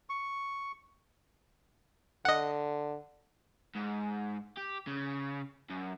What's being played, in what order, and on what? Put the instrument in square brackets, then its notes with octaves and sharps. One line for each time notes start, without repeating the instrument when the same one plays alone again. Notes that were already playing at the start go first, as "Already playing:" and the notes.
[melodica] C#6
[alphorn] D3 [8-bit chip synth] D#5 F#5
[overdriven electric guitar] G#2
G4
C#3
F#2